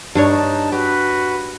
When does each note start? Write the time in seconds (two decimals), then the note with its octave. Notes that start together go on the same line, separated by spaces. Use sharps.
0.15 G2 D4 D#4 C#5 A5
0.72 F#4 G4 B4